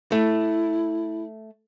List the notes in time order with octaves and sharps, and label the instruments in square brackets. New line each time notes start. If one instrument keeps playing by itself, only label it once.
[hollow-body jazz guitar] A3 [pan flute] E4